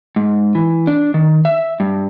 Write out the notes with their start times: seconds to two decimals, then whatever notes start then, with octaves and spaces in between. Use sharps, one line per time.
0.16 G#2
0.55 E3
0.87 D4
1.14 D#3
1.45 E5
1.80 G2